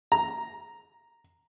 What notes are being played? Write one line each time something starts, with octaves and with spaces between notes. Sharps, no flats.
A#5